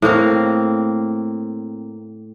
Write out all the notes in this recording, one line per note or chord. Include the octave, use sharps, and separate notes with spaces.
A2 A#3 C4 A#4